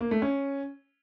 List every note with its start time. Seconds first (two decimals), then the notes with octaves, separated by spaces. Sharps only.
0.01 A#3
0.11 A3
0.22 C#4